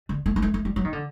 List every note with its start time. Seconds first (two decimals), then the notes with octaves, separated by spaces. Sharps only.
0.09 D3
0.26 A3
0.36 A#3
0.42 A3
0.54 A3
0.65 G3
0.76 F#3
0.84 D#3
0.93 D3